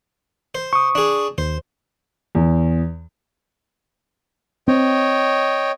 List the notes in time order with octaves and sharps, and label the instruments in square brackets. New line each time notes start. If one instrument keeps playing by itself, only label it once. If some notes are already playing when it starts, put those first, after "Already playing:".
[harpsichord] C5
[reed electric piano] C#6 D#6
[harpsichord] D4 G#4
[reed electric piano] D#2 [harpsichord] C5
[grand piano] E2
[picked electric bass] C4 [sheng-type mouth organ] C#5 D#5 G5